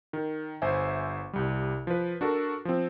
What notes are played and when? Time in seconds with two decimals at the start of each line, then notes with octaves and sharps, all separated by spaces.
0.13 D#3
0.62 G1 C5 E5 G#5
1.33 C2 G3
1.87 F3 B4
2.21 D4 F#4 A4 A#4
2.65 F3 C4